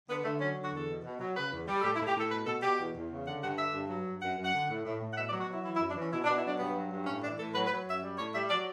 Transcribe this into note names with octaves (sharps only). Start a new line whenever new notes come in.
D3 B3
D3 A3
F#3 C#4
D3
F#4
E2 A4
B2
B2
F#3
C#3 B4
E2
G3
A4
A2 G4
E4
A2
G4
A2 A4
B2 B4
B2 A4
B2 G4
E2
E2
C#3
D3 F#5
G2 F#5
D3 E5
G2
F#3
G2
F#2 F#5
F#2
F#5
D3
A2
A2
A2
F#5
B2 E5
D5
F#3
F#4
F#3 E4
E3 E4
E4
F#2
D4
E3 C#4
B2 E4
D4
B2
E4
F#3 D4
G2 B3
F#3
G2
A2 C#4
E3 D4
A2 A4
F#3 B4
B4
F#3
F#2 E5
G3
A2 C#5
G3 E5
F#3 D5